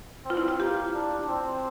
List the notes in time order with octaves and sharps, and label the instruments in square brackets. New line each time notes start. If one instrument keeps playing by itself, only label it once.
[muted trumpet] C4 [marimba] F4
[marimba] E4
F4
[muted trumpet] A#3 [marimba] G4
[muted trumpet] D4
C4